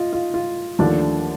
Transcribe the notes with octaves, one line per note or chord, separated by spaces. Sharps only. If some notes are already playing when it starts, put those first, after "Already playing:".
Already playing: F4 D#5
F4
F4
D#2 D3 F3 A3 D4